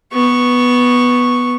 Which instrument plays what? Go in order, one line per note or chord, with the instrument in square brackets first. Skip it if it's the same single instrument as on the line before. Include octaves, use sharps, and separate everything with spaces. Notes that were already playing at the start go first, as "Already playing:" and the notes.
[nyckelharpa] B3 C#6